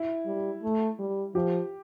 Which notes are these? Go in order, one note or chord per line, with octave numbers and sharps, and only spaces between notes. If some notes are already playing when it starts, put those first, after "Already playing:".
Already playing: E4
G3
A3
G3
F3 G4